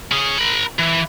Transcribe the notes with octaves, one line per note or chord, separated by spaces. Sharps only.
C#4 G#4
A#4 B5
E3